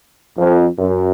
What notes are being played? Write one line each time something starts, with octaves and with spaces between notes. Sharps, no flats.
F2
F#2